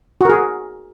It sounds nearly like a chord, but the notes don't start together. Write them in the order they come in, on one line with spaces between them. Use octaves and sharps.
F#4 A#4 G#4